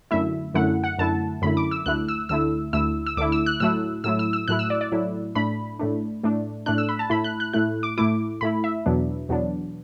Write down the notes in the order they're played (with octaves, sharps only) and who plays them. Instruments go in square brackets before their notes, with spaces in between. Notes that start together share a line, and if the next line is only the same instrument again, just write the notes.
[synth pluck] F#2 D3 A3 E4 E5
F#2 D3 A3 E4 F#5
F#5
F#2 D3 A3 E4 A5
F#2 D3 A3 E4 B5
D6
E6
D2 D3 A3 E4 F#6
E6
D2 D3 A3 E4 E6
D2 D3 A3 E4 E6
E6
D2 D3 A3 E4 D6
E6
F#6
A2 F#3 A3 E4 E6
A2 F#3 A3 E4 E6
E6
E6
A2 F#3 A3 E4 F#6
E6
D5
D5
A2 F#3 A3 E4
A2 A3 D4 B5
A2 A3 D4
A2 A3 D4
A2 A3 D4 F#6
E6
B5
A5
A2 A3 E4 B5
F#6
F#6
A2 A3 E4 F#6
D6
A2 A3 E4 D6
A2 A3 E4 B5
E5
E2 B2 F#3 B3 D4
E2 B2 F#3 B3 D4